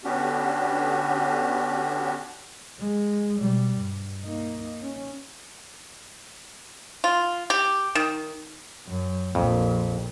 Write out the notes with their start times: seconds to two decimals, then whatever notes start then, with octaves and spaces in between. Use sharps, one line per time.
0.04 D3 B3 C#4 D4 F#4 G4
2.79 G#3
3.38 B2 G3
3.77 G2
4.24 A#3 D#4
4.82 C#4
7.04 F4
7.50 G4
7.95 D#3
8.87 F#2
9.35 A#1 F2 A#2